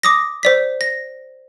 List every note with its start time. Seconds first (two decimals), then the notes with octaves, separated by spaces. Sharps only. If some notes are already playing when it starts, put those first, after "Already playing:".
0.03 D6 D#6 A#6
0.43 C5 D5 B6
0.81 A#6